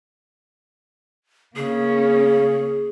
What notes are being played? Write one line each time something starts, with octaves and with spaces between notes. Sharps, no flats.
C#3 A#3 C#4 G#4